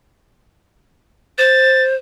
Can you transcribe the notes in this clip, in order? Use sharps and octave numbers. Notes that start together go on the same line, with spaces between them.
C5 A6